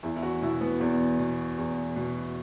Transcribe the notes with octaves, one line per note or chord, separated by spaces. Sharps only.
E2 E4
E4
F#4
B2 E4
B3
E2 B3
B2
E2
B2